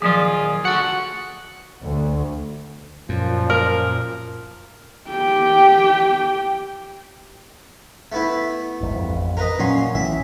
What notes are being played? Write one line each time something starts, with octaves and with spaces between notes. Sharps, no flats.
D#2 A#2 F3 F#3 F4 G#4
D2 F#4 A4 F#5
D2
F#2 A#2 F3
A#4
G4 G5
A3 B3 E4
D1 G#1 G#2
A1 F2
A#4 B4 D#5
A#2 F#3 C#4 C6
B1 A2 E3 E5